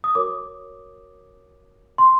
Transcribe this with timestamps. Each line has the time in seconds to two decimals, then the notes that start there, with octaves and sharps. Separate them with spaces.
0.04 D#6
0.15 F#4 A#4 C#5 D6
1.98 C6